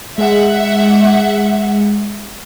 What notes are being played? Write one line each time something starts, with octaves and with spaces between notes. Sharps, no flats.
G#3 E5 F#5